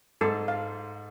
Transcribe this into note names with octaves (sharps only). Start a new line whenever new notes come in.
G#2 A4
F5